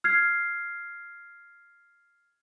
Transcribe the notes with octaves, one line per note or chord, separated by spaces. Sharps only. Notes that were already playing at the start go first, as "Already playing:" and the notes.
F6 G#6 C7